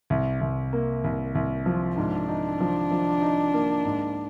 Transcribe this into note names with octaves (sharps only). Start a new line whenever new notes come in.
C2
C2
A#3
C2
C2
F3
G#2 D4
D#4
F3
F3
D#4
A#3
G#2